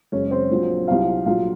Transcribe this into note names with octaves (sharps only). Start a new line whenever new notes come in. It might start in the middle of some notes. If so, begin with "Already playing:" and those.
F#1 F#2 C#3 G#3 C#4 C#5
C4 C5
A#1 A#2 F#3
C2 C3 F#3 F4 F5
A#1 A#2 F#3 F4 F5